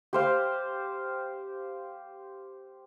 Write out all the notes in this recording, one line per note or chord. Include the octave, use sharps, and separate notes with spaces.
G4 C5 F5